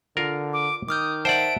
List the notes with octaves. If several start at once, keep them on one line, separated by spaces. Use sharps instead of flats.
D3 F4 A#4
D6
D#3 D6 D#6 F6 G6
C5 D5 E5 F#5 A5 D7